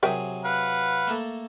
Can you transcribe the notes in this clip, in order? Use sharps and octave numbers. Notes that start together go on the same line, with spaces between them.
C3 F#3 G#4 A#4 E5 G5
B4 F5 F#5
A3 A#3 A4